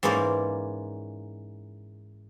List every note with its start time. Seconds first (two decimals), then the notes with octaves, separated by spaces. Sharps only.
0.03 G#2 E3 A#3 C#4 C5 D5